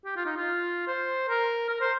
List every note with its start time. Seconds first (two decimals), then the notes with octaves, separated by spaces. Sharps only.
0.05 G4
0.16 F4
0.26 D#4
0.36 F4
0.87 C5
1.29 A#4
1.69 A#4
1.81 C5